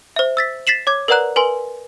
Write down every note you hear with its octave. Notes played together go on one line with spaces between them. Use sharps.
C5 E5
E6 A6 B6
A6 B6 C7 E7 F#7
C#5 D6 G#6
A#4 B4 D5 F#5 A#5 F#6
A#4 B4 G#5 C6